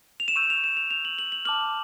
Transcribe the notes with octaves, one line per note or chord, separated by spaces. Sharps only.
F7
E7
C#6 E6 G6 D#7
F7
E7
F7
F7
F#7
F#7
F#7
A5 D6 F6 F#7